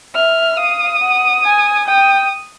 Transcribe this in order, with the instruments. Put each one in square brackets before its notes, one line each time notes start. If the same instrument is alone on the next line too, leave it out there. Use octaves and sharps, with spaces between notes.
[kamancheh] E5 [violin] F6
[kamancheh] F5 [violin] D#6
[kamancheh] F#5
G#5
[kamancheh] G5 [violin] D#6